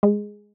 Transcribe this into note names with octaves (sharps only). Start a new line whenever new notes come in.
G#3